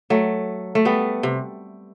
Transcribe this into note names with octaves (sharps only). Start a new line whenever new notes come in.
F#3 A3
A3
G3 B3
C3